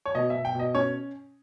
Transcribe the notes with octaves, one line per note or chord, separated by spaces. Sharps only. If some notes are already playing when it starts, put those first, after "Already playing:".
C#5
B2 D#5
E5
B2
G5
B2 D#5
C#4 C#5